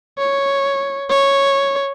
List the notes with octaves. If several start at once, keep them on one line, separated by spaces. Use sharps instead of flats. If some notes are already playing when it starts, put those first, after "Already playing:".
C#5
C#5